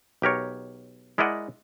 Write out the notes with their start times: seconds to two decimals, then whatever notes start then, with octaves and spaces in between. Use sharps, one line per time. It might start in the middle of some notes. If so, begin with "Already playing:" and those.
0.22 B1 G4 A#4 C#5
1.18 G#3 E4 A#4 D5 D#5 F#5